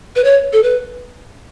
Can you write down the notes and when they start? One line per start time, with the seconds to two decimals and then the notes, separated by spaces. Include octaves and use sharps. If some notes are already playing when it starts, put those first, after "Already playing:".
0.16 B4
0.24 C#5
0.53 A4
0.63 B4